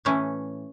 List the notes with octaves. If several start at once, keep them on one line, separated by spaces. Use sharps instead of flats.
A2 E3 A3 C#4